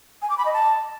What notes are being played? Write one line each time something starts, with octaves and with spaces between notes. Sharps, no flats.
G#5
D6
B5
D#5
A5